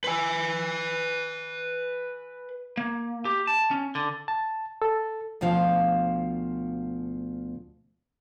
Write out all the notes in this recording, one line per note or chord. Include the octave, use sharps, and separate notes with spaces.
B4 G#5
A#3
G4
A5
C#4
D3
A5
A4
D2 B2 F3 F5